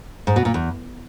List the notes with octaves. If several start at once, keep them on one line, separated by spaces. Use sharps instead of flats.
G#2
B2
A#2
E2